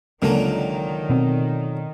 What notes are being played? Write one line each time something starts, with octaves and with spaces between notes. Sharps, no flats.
C#2 A#2 D3 D#3 F#3 A#3 A#4
B2 B3 C4